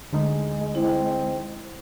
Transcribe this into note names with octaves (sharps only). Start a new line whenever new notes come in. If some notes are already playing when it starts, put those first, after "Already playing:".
D2 D3 G#3 D#4
C4 E4